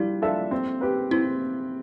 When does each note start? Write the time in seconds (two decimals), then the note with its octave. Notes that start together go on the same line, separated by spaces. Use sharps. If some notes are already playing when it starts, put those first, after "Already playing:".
Already playing: G3 D4 E4 F4
0.22 D4 F4 A4 E5
0.51 C4
0.81 G4 B4
1.11 C4 E4